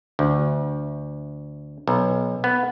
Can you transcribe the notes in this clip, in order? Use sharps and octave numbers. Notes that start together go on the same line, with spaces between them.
D2
B1
B3